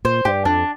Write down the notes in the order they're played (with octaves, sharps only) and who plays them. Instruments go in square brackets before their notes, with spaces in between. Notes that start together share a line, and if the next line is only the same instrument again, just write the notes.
[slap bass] A#2 [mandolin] C5
[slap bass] G2 [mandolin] G4
[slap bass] F2 [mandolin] D4